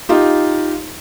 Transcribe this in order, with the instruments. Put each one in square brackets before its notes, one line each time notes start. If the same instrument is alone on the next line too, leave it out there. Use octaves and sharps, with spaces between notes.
[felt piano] D#4 F4 G4